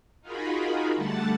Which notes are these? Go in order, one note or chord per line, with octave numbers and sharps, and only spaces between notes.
D#4 F4 F#4 G#4 A#4 B5
D3 G3 A3 F#5 A5 A6